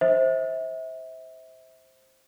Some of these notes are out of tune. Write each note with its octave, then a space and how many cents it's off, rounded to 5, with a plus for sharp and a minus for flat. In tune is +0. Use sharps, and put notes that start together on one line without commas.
C5 +10 E5 -30